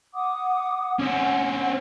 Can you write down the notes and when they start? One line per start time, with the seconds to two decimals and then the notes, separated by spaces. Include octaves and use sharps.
0.14 F#5 D6 D#6
0.99 C4 C#4 F#5